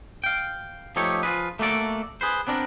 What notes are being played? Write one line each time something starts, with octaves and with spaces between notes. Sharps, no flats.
F5 G5
F3 A3 D#4 G4 A4 C#5
F3 F4 F#4 G#4 B4
A3 A#3 F#4 A4 D5
G#4 B4 C5
B3 C4 D4 A4 A#4